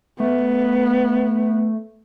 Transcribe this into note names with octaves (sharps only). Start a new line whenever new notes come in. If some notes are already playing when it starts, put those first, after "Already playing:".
A3 B3